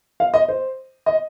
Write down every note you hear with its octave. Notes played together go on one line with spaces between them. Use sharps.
F5
D#5
C5
D#5